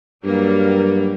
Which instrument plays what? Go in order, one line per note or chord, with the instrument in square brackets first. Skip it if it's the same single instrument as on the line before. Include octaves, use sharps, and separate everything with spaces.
[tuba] G2 [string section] F#3 G3 A#3